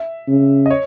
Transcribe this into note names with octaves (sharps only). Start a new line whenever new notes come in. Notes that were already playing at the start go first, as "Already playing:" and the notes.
Already playing: E5
C#3
D#5
C#5